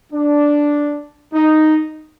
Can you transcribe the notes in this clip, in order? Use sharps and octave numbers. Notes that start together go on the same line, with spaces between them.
D4
D#4